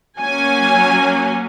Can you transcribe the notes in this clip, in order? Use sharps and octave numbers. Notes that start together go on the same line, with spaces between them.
F#3 A#3 C#4 G#5